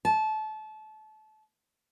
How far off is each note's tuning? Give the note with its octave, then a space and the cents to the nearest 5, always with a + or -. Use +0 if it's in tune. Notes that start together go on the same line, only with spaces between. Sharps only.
A5 -25